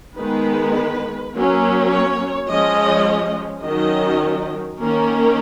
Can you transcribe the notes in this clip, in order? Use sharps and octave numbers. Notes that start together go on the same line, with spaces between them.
D#3 G#3 B3 B4
F#3 A#3 C#4
C#5
F3 G#3 C#4 D#5
D#3 F#3 C#4 D#5
D#3 A#3 C#4 A#4